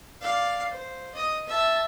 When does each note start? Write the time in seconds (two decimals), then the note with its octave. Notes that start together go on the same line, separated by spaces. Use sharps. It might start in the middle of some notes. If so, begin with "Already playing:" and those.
0.20 D5 F5
0.70 C5
1.15 D#5 D#6
1.48 E5 A5